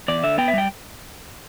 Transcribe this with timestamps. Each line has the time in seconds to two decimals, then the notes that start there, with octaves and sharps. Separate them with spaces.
0.08 E2 D5
0.24 D3 E5
0.38 B3 G5
0.48 E5
0.53 G3 G5